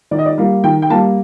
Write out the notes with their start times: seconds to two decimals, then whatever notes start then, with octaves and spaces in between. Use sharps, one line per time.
0.11 D#3 D5
0.19 D#5
0.26 D5
0.38 G3 A#3
0.64 D#3 G5
0.82 G5
0.90 G3 A#3 A5